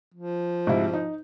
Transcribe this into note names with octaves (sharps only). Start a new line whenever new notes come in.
F3
G#2 C3 E4
D#4